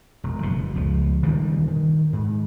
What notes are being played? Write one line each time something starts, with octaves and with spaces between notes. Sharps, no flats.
E1
F#1 B2
C#2 F3
E1 D2 D#3 G3
D#3
G#2